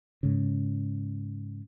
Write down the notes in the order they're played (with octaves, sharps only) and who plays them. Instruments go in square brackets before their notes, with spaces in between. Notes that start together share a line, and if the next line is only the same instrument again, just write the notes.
[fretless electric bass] G#2 C#3